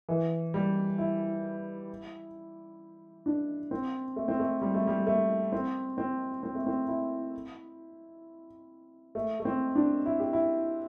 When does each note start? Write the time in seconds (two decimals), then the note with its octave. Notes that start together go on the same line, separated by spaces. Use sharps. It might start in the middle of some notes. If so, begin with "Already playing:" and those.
0.09 E3
0.54 G3
0.98 E4
3.26 D4
3.71 C4
4.16 A3
4.28 C4
4.40 A3
4.62 G3
4.74 A3
4.87 G3
5.07 A3
5.52 C4
5.98 C4
6.43 C4
6.55 A3
6.67 C4
6.88 E4
9.15 A3
9.40 A3
9.45 C4
9.75 D4
10.06 E4
10.20 G4
10.33 E4